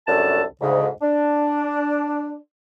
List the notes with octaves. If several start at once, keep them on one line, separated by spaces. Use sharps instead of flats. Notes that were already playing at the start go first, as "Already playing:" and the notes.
C2 F#2 A3 D4 A4 A5
D2 G#2 C#3
D4